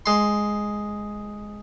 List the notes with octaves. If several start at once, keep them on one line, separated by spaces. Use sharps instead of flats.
G#3 C6